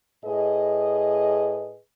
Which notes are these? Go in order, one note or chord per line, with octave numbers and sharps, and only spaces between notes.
A2 G#4 B4 D#5